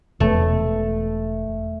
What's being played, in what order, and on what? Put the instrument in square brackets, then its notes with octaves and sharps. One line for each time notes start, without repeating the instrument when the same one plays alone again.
[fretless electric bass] E1 [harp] A3